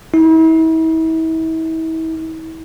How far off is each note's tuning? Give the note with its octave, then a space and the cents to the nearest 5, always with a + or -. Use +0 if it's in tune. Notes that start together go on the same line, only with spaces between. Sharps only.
E4 -40